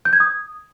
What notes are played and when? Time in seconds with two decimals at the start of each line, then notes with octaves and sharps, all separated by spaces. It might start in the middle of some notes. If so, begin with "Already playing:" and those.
0.05 G6
0.13 G#6
0.20 D#6